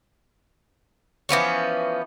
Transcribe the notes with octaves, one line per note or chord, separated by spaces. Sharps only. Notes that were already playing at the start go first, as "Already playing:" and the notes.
E3 F3 B3 C#4